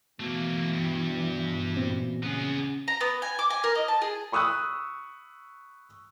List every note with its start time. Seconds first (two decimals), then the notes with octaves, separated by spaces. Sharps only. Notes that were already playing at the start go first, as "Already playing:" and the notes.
0.20 B2 E3 A3 A#3
0.74 G2
1.77 A#2 C4
2.23 C#3 B3 G#4
2.88 A#5
3.01 B3
3.22 G#5
3.39 D6
3.50 G#5
3.64 A#4
3.75 D#5
3.88 A5
4.02 G#4
4.32 B5 C#6 D#6 E6 F#6